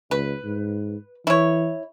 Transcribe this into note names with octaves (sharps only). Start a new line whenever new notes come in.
C#2 B4
G#2
E3 E4 C#5